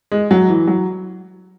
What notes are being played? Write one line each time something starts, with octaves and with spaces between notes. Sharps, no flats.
G#3
F#3
E3
F#3